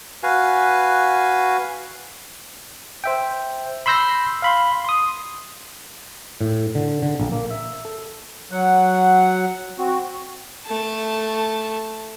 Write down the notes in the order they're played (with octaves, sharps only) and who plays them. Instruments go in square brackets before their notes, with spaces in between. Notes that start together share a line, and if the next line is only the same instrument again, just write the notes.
[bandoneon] F#4 B4 F5 G#5
[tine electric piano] C5 E5 G5
B5 C6 E6 G6 A#6 C7
F5 B5 C6
C6 D#6
[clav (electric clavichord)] A2
D3
D3
A#1
A#3
E5
A4
[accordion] F#3 F#5
C4 F#4
[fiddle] A3 A5